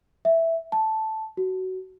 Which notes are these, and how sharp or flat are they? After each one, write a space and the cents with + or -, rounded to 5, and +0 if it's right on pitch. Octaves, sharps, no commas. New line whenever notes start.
E5 +0
A5 -5
F#4 +15